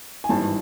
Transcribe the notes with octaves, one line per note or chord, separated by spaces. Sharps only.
G#5
G#1 G2 E3 A5